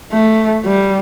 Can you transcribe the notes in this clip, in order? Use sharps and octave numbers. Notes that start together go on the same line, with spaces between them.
A3
G3